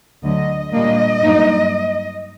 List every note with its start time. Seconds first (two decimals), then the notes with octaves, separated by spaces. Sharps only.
0.23 D2 D3 F#3 D#5
0.73 A#2 G3 A#3 D4 D#5
1.21 G2 F#3 A#3 D#4